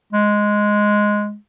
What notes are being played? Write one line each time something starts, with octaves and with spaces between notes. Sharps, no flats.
G#3